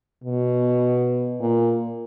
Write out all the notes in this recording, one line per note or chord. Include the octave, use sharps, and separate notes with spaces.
B2
A#2